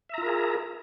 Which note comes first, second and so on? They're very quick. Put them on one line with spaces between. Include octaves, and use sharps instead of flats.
E5 A#5 F4 A#4 G#4